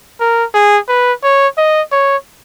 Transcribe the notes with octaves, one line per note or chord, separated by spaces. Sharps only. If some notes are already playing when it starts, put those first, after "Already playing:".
A#4
G#4
B4
C#5
D#5
C#5